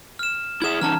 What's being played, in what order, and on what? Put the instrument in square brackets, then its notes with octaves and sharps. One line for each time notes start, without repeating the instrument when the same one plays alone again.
[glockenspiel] F6 E7
[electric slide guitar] E4 G#4 E5 [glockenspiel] G#6 E7
[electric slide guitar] E3 C#4 D#4 [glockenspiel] A5 A#5 F6